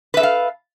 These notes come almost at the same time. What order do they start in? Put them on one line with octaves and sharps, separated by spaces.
B4 E5 A4 F5